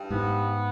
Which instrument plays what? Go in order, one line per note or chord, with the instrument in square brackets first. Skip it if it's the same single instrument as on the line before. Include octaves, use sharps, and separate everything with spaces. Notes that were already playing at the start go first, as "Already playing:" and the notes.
Already playing: [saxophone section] G2
[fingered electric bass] G#2 [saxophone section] B3